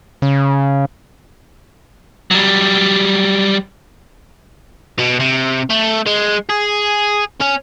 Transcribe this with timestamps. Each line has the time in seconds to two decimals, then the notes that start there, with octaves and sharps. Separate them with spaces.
0.22 C#3
2.31 F#3 G3
4.99 B2
5.20 C3
5.70 A3
6.06 G#3
6.49 G#4
7.41 C#4